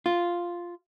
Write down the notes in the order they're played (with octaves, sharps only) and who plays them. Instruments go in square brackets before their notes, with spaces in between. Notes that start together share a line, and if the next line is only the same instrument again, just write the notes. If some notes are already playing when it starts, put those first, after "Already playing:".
[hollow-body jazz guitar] F4